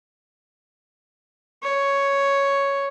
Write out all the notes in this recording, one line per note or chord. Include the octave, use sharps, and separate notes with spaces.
C#5